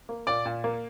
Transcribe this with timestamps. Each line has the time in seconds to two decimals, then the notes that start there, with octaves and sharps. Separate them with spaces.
0.09 A#3
0.27 A#2 D5 D6
0.46 A#2
0.64 A#3